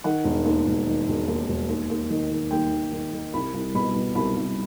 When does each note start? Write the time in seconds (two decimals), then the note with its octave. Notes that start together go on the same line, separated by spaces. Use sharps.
0.04 D#3 F#5
0.24 E1
0.45 D#2
0.67 E1
0.87 D#3
1.08 E1
1.28 D#2
1.48 E1
1.69 D#2
1.90 D#2
2.10 D#3
2.31 D#3
2.51 D#2 G5
2.72 D#2
2.92 D#3
3.13 D#3
3.34 C2 B5
3.54 C2
3.75 B2 B5
3.95 B2
4.15 C2 B5
4.36 C2